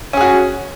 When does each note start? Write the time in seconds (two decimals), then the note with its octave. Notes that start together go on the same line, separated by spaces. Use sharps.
0.13 C#4
0.17 G#4
0.21 F#4